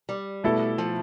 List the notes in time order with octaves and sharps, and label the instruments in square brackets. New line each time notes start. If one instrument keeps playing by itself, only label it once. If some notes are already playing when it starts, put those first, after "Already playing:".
[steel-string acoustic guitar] G3
[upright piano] B2 A3 E4 A4
[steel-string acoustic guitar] F3